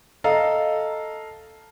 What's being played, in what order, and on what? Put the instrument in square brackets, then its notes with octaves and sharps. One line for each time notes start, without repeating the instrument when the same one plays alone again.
[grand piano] A4 D#5 F5 A#5